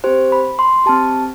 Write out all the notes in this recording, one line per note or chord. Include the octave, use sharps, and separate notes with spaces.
C4 G4 C5
B5
C6
C4 G4 A5